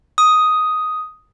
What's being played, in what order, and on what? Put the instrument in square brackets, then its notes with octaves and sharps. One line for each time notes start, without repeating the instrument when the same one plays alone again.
[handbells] D#6